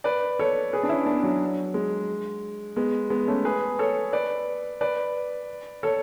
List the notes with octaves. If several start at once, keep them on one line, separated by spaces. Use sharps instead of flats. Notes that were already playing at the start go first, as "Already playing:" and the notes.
B4 D5
A4 C#5
G#4 B4
D4
C#4 E4
B3 D4
F#3
G#3
G#3 B3
G#3 B3
A3 C#4
G#4 B4
A4 C#5
B4 D5
B4 D5
A4 C#5